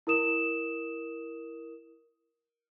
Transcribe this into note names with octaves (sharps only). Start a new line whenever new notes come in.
E4 A#4 D#6 E7